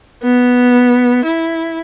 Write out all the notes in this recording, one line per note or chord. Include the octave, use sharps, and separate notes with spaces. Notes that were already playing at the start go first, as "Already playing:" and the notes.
B3
E4